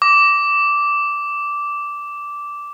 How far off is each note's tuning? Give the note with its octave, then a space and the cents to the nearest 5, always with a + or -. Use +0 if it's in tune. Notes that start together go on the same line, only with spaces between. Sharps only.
D6 -10